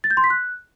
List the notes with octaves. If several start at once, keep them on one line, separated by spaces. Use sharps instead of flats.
A6
G6
C6
B6
F#6